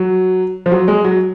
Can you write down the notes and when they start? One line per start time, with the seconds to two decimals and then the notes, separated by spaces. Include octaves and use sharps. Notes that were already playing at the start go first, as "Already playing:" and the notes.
Already playing: F#3
0.66 F3
0.72 F#3
0.88 G#3
1.04 F#3